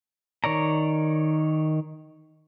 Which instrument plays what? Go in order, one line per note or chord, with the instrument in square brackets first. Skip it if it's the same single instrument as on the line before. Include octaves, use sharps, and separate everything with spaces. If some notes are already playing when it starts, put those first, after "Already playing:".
[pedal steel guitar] D#3 C#5 D5 A#5